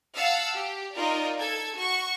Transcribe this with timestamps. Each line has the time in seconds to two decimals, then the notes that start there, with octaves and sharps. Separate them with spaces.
0.15 F5 F#5 A5 E6
0.55 G4
0.94 D#4 F4 A#4 D5
1.38 A4 G#6
1.74 F#4 C#6